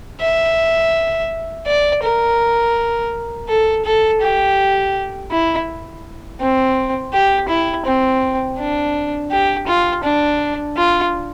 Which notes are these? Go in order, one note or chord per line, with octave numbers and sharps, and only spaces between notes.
E5
D5
A#4
A4
A4
G4
E4
C4
G4
E4
C4
D4
G4
F4
D4
F4